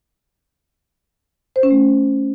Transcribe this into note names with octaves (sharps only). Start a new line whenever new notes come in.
C5
C#4
A3